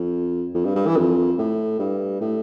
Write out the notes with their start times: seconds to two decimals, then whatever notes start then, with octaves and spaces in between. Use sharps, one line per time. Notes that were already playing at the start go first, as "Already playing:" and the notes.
Already playing: F2
0.54 F2
0.65 G2
0.75 G2
0.86 E3
0.96 F2
1.38 A2
1.79 G2
2.21 A2